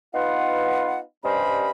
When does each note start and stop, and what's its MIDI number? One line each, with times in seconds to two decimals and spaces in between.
0.14 0.99 59
0.14 0.99 63
0.14 0.99 65
0.14 0.99 71
0.14 0.99 77
0.14 0.99 78
1.24 1.71 43
1.24 1.71 55
1.24 1.71 61
1.24 1.71 72
1.24 1.71 75
1.24 1.71 83